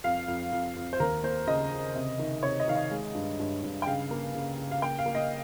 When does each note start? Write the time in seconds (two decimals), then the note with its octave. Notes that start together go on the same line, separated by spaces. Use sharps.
0.04 F2 F5
0.28 F2
0.52 F2
0.76 F2
0.93 C5
1.00 D#2 A#4
1.23 A#3 C5
1.47 C#3 D#5
1.71 C#3
1.95 C3
2.19 D#3
2.43 C3 C#5
2.60 D#5
2.68 D#3 F5
2.75 D#5
2.91 G#3
3.15 G2
3.39 G2
3.63 G2
3.82 G5
3.87 C#3 F5
4.11 A#3
4.35 C#3
4.58 C#3
4.71 F5
4.82 A#3 G5
4.98 F5
5.06 A#3
5.15 D#5